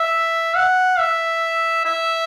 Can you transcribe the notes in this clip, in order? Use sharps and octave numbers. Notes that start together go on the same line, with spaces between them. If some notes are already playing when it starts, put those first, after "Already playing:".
Already playing: E5
F#5
E5
E5